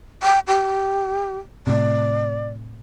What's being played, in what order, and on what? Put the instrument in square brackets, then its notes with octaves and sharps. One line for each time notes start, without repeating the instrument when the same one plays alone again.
[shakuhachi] G5
G4
[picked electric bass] A2 C3 [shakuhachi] D5